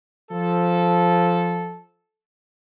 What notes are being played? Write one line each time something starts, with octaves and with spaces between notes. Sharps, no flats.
F3 A4